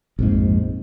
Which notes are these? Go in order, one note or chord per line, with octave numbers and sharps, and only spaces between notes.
A#1 F2 G#2